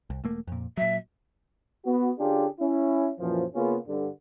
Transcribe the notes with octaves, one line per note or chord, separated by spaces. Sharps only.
C2
E1 A3 A#3
F2 A#2
A#2 F#3 E5
B3 F#4
D3 C#4 D4 F4 G4 G#4
C#4 E4
F#2 A#2 E3 F3
C#3 A#3 B3 C#4 F4 G#4
G2 D3